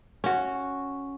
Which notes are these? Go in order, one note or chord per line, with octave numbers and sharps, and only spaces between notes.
C#4 F#4